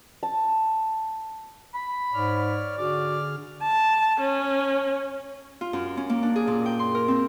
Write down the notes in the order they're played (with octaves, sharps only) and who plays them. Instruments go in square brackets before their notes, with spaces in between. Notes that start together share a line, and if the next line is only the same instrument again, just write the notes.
[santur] A5
[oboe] B5
[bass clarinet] G#2 [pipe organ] C#5 D5 F6
[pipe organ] D3 G#4 F6 [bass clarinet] F#4 [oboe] D5
[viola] A5
C#4
[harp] F4
F#2
C#4
A#3
D4
G#4
A#2
G5
C6
A#4
C4